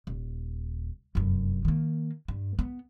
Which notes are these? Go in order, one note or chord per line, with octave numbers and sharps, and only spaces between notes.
D#1
F1 F#2
D#3 A#3
G2
B3